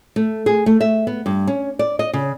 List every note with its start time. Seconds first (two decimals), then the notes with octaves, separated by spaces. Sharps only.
0.16 A3
0.46 G#4
0.66 A3
0.81 E5
1.07 B3
1.26 G2
1.47 C#4
1.79 D5
1.99 D#5
2.13 C#3